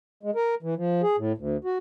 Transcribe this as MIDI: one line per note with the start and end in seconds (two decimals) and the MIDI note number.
0.23 0.31 56
0.35 0.55 70
0.63 0.74 52
0.77 1.02 53
1.03 1.16 68
1.18 1.32 45
1.38 1.57 38
1.64 1.78 66